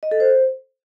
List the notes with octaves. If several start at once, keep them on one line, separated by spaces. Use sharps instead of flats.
D#5
A4
C5